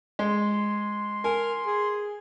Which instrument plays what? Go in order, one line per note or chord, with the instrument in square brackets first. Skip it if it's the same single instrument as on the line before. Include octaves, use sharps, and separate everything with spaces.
[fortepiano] G#3 [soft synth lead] C6
[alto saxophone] A#4 [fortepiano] G#5
[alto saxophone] G#4